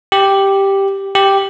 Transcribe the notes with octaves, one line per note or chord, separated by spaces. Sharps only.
G4
G4